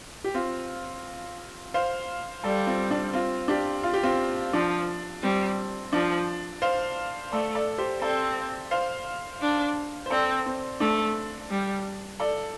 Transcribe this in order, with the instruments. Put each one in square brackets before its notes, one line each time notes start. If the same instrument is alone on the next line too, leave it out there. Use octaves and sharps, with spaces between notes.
[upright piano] G4
C4 F4
C5 F5
[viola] G3 [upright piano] A4 D5
[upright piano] C4 F4
D4
C4 F4
D4 G4
F4
G4
C4 F4
[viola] F3 [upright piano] D4
[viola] G3 [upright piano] C4
[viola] F3 [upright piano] D4
[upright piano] C5 F5
[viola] A3 [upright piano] A4 D5
[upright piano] A4 D5
G4 C5
[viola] C4 [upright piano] A4 D5
[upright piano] C5 F5
[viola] D4
[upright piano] C5
[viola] C4 [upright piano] A4 D5
[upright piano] C4
[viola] A3 [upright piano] D4
[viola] G3
[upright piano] A4 D5